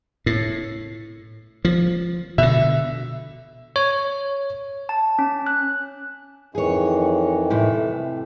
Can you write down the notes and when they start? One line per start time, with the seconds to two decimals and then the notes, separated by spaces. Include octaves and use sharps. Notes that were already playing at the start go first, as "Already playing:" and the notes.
0.26 A2
1.65 F3
2.38 B2 D3 E5
3.76 C#5
4.89 A5
5.19 C#4
5.47 F#6
6.55 F2 D#3 E3 G#4 C#5
7.50 A2 C3 E5